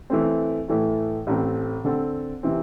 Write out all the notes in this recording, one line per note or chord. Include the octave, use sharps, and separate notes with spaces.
E3 A3 C4
A2 E3 A3
A1 A2 A3 C4
D3 C4 A4
C3 E3 C4